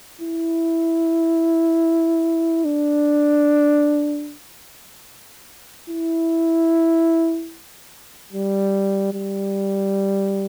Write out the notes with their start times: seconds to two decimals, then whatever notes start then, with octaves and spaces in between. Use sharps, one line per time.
0.21 E4
2.65 D4
5.90 E4
8.33 G3
9.14 G3